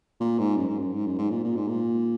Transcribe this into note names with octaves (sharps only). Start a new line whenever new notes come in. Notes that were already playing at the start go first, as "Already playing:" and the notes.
A#2
G#2
F#2
G#2
F#2
G#2
F#2
G#2
A#2
A#2
G#2
A#2